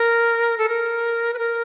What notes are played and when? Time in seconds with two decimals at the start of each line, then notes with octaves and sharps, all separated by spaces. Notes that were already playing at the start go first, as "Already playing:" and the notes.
Already playing: A#4
0.58 A4
0.69 A#4
1.34 B4
1.38 A#4